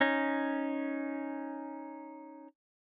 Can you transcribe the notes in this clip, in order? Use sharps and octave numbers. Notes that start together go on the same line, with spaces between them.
C#4 D#4